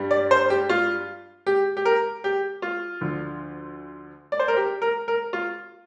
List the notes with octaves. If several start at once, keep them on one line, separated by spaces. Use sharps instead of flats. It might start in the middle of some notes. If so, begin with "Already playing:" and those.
Already playing: G2 G3
D5
C5
G4
F4
G4
G4
A#4
G4
F4
D2 D3 F3
D5
C5
A#4
G4
A#4
A#4
F4